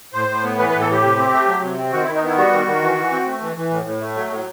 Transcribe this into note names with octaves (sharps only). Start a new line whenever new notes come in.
A2 C5
A2
B3
E3 B4
B4
A2
A4
A2 G4
C3
C4
A3
F#3
C3
C4
D#3 F#4
E4
D#3
D#4
B3 E4
G3 F#4
D#3
D#3
E3
E3
C4
A3
E3
E3
A2
A2
A3
F#3
A2